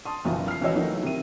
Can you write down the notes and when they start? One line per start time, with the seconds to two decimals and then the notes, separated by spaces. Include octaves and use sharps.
0.05 A5 C6 D#6
0.25 F#1 B1 F#2 D#3 E3 F4
0.48 F6 C7
0.61 C#2 E3 F#4 C#5 D#5 E6
0.75 E3 F#3 A3 A#3 D#4
1.03 C3 D#3 D#7